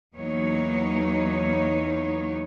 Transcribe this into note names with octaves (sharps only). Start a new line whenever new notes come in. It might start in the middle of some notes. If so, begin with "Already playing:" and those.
E2 F#3 A#3 B3 D#4 C#5